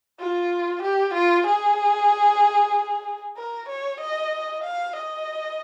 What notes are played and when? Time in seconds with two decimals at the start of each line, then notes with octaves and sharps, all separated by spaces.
0.20 F4
0.83 G4
1.14 F4
1.47 G#4
3.37 A#4
3.69 C#5
4.01 D#5
4.64 F5
4.96 D#5